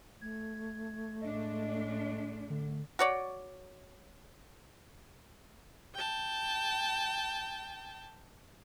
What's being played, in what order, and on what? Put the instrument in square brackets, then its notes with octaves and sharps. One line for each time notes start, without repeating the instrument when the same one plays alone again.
[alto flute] A3 [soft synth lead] G#6
[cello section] A2 G#3 D4 [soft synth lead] D#5
[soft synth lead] D3
[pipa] F#4 C#5 D5
[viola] G5 A5